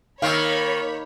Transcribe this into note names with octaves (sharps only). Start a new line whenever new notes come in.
D#3 A#3 C#5 F5 B5 C#6 E6